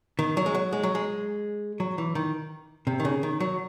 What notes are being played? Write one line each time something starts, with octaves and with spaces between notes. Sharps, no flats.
D#3
F#3
G#3
F#3
G#3
F#3
G#3
F#3
E3
D#3
C3
D#3
C#3
D#3
F#3